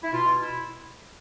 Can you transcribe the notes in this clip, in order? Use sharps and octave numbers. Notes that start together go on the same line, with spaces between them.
E4
B2 F4
E4